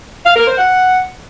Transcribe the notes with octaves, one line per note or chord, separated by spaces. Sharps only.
F5
A#4
C5
F#5